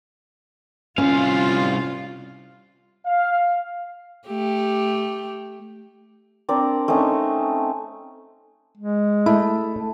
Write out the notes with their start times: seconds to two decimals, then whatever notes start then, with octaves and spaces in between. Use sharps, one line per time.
0.98 C2 C#4 F4 F5
3.05 F5
4.28 A3 G4
6.49 C4 D4 A#4 D5
6.88 A3 C4 C#4 D#4
8.77 G#3
9.26 A3 E4